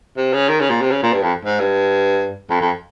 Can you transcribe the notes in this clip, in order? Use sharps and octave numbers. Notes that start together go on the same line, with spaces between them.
C3
C#3
D#3
C#3
A#2
C3
C#3
A#2
G2
F2
G#2
G2
F2
F2